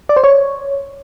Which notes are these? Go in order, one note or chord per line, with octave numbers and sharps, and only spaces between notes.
D5
C5
C#5